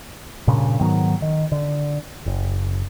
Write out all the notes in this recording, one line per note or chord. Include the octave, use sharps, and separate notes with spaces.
G2 A#2 C#3
G#2 D#3 F#3 B3
D#3
D3
F#1